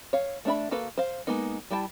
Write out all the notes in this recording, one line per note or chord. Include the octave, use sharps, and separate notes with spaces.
C#5 F5
A3 D4 E5 B5
A#3 F#4 A4 B4 F5
C5 F5
G#3 A#3 B3 D#4
G3 E4 G5 A5